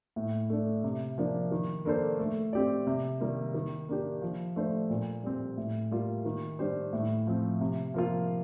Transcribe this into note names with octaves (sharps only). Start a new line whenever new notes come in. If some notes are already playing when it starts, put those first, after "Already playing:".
A2
A3 D4
C3
F3 A#3 D4
D#3
A#3 D4 A4 C5
A3
C4 G4 D5
C3
D#3 G3 A#3
D#3
A#3 D4 G4
F3
A3 D4 A4 C5
A#2
G3 C4
A2
G3 A#3 F4
D#3
G3 D4 G4 C5
A2
F3 C4
C3
F3 A#3 F4